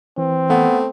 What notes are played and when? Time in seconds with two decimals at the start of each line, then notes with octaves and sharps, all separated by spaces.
0.18 E3 C4
0.50 A3 B3